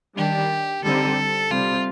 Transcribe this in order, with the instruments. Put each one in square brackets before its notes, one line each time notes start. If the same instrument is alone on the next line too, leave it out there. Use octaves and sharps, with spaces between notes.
[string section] D#3 G3 D4 [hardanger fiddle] G4
[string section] D3 G3 C4 D#4 [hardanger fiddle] A4
[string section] C3 G3 C4 [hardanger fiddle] F4